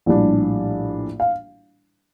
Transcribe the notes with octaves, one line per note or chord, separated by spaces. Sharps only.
A#1 A2 G3 D4
F5